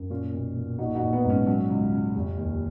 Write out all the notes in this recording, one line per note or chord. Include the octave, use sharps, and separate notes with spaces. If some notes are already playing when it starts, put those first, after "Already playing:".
Already playing: F#2
A#2 C#4 F4
B1
A#2
A#1 D#4 F#4
D#4 F#4
A#1
B3 D#4
G#2
C#4
F#3 C#4
C#2
C#3
F1
D#2